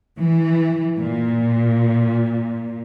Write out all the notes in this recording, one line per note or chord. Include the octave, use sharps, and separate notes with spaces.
E3
A#2